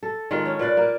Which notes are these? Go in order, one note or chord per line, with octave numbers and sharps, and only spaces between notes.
A4
D#3 G#3 F4 A4
C#4
A#2 B4 D5
A#3